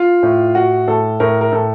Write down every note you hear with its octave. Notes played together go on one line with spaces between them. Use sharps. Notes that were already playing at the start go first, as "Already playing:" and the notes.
Already playing: F4
A2
A2 F#4
A2 A4
A2 A#4
A#4
A2 A4